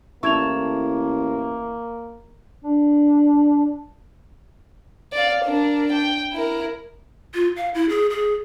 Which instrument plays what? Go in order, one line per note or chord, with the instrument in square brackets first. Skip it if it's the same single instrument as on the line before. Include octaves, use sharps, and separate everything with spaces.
[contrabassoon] A1 [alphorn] A#3 [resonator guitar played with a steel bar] E4 A4 [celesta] C#6 G#6 F7
[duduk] D4
[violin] D5 F5
D4 A#4
G5
E4 A#4
[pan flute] F4
F5
E4
G#4
G#4